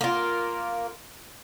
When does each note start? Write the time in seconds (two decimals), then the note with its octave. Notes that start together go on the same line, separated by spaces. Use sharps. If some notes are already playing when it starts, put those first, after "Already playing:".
0.01 A#3 F4